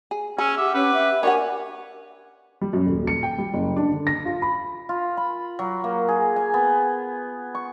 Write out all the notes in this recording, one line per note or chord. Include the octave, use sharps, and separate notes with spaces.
G#4
C#4 G#4 E6
G4 E5 F#5 D6
C#4 B4
E5
D4 G4 A#4 C#5 F#5 G#5
G3
F#2
D#1
C#7
G5
G3
F#1
D4
D3
A#6
F4
B5
F4
B5
F#3
A#3
G#4
G#5
B3
C#6